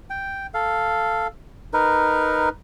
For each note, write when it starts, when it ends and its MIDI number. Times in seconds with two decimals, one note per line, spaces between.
0.10 0.47 79
0.54 1.27 69
0.54 1.27 77
1.73 2.49 63
1.73 2.49 70
1.73 2.49 71